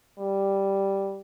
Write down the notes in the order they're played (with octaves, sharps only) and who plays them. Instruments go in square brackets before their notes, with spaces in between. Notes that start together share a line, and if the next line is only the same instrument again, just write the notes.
[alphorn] G3